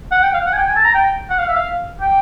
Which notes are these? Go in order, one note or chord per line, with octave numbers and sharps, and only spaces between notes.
F#5
G5
F5
F#5
G#5
G5
G#5
A5
A#5
G5
F#5
F5
E5
F5
G5